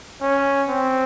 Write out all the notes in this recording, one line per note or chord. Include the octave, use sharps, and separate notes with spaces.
C#4
C4